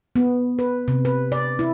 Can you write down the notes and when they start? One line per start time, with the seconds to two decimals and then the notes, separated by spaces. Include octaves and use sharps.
0.16 B3
0.59 B4
0.88 C3
1.05 B4
1.32 D5
1.59 E4